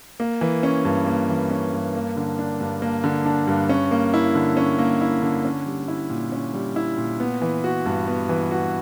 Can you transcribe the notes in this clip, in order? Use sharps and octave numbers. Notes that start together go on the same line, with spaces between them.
A#3
E3
C#4
G2
A#3
E3
C#4
G2
A#3
D3
D4
G2
A#3
D3
D4
G2
C#4
A#3
E4
D3
C#4
A#3
E4
D3
C#4
G3
E4
A#2
C#4
G3
E4
A#2
B3
E3
F#4
G2
B3
E3
F#4